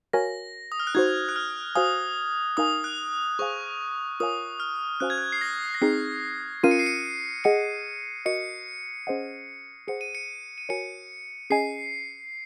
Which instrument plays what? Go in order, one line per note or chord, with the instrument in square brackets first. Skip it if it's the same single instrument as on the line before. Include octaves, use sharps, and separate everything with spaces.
[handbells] F#4 A#4 C#5 F5 G#5 [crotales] A#6
[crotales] D#6
F6
F#6
[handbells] D#4 F#4 C5 [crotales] G#6
[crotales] F#6
F6
[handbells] F#4 C5 F5 G#5 [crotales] D#6
[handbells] D#4 A#4 F5 G#5 [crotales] D#6
[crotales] F#6
[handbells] G#4 C5 F5 G#5 [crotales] C#6
[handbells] F4 A#4 C#5 F5 G#5 [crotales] D#6
[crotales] F6
[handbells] C#4 F#4 C5 F5 G#5 [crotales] F#6
[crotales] G#6
F#6
C7
A#6
A#6
[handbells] C4 D#4 G#4 [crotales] C7
[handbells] C#4 F4 A#4 F5 [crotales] D#7
[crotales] C#7
C7
C#7
[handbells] G#4 D#5 F#5 [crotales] C#7
[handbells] F#4 A#4 D#5 [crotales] C#7
[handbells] C#4 G#4 C5 D#5 F#5
[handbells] G#4 C5 F#5 [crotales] C#7
[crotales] D#7
C#7
D#7
[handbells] F#4 A#4 C#5 G#5 [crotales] C#7
[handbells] C#4 G#4 D#5 G#5 [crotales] C7